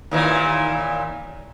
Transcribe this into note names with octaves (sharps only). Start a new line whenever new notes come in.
D#2 A#2 E3